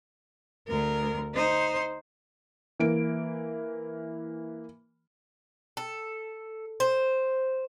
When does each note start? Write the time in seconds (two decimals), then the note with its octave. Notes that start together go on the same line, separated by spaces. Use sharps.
0.67 D2 A#4
1.34 D#4 C5
2.80 E3 A#3 D7
5.77 A4
6.80 C5